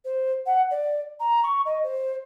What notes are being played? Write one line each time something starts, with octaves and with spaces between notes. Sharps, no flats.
C5
F#5
D5
A#5
C#6
D#5
C5